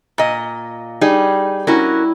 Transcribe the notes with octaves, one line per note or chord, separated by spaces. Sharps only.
A#2 D#5
G3 D#4 G#4
C#4 E4 F#4 A#4